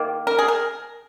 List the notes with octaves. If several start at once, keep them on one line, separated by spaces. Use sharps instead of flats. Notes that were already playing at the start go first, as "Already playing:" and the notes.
Already playing: D#3 A#3
A#4
G#4
A#4